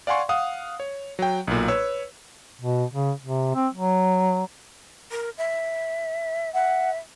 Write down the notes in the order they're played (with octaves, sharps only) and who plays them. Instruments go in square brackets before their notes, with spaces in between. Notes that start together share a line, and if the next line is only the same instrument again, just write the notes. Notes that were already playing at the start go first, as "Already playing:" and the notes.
[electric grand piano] D5 F5 F#5 G#5 C6 C#6
F5 F#5 D#6
C#5
F#3 G5
B1 A#2
B4 C#5 E6
[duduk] B2
C#3
C3
C4
F#3
[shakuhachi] A#4
E5
[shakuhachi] E5 [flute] F#5